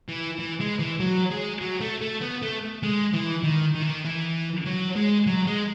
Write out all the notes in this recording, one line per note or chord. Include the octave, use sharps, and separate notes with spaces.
E3
E3
G#3
E3
F#3
G#3
F#3
A3
A3
B3
A3
G#3
E3
D#3
D#3
E3
D#3
E3
F#3
G#3
F#3
G#3